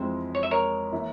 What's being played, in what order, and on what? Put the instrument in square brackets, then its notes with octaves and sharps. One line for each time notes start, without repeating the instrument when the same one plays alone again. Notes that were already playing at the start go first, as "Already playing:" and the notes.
Already playing: [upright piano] F2 E3 G#3 C4 [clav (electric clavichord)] C5 E5
[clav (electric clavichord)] C#5
E5
A#4 C#5
[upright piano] E3 A#3 E4